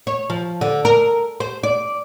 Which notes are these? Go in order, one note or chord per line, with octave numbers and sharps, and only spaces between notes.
C#5
F3
D3
A#4
C5
D5